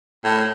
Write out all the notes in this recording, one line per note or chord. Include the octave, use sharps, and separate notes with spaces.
A2